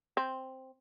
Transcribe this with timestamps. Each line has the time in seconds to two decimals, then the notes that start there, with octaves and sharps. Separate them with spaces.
0.17 C4